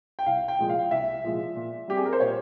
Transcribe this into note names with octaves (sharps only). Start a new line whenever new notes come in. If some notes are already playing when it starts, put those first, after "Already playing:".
G5
C2 F5
G5
A#2 F3 G#3
F5
C2 E5
A#2 F3 G#3
A#2
G3 C4 G4
G#4
A#4
C5
A#2 C#5